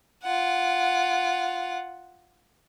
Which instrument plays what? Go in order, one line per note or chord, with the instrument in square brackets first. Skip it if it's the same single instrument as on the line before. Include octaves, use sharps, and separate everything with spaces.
[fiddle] F4 F#5